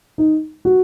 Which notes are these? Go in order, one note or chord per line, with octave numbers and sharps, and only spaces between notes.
D#4
F#4